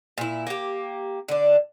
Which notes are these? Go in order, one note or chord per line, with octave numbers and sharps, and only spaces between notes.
A#2 E4
A#3 G4
D3 D4